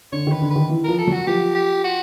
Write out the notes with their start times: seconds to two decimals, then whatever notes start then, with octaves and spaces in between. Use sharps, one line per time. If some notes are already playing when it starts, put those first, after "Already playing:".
0.12 D3 C#5
0.27 D#3
0.32 B4
0.42 D3
0.51 D#3 B4
0.70 E3
0.84 F3 A#4
0.98 A4
1.07 F#3 F#4
1.27 F3 G4
1.55 G4
1.84 F#4